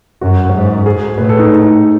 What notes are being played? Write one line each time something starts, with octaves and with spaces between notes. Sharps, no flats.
F#2 F#4
G#2
G#4
A2 B4
A4
D#4